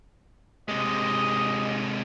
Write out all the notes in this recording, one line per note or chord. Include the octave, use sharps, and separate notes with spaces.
C3 G#3 D#5